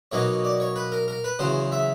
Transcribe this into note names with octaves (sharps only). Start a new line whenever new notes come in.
B2 F#3 A#3 D#4 C#5
D5
C#5
B4
A#4
A#4
B4
E2 C#3 F#3 C5
E5